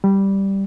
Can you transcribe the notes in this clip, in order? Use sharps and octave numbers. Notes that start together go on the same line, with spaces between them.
G3